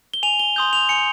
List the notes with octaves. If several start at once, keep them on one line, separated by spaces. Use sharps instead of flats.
G7
G#5 F7
G7
C6 D#6 G6
F7
G#5 C#7